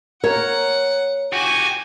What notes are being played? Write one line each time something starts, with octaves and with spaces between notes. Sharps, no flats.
A#4 C#5 F#5
F#4 G4 G#5